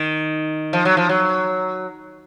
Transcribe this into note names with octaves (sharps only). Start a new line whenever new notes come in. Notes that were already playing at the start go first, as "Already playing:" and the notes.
Already playing: D#3
F3
F#3
F3
F#3